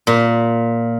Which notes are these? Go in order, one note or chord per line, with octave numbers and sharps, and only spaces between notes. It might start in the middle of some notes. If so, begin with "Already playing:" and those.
A#2